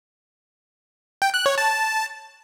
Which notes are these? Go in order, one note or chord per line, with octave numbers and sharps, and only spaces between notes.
G5
F#6
C#5
A5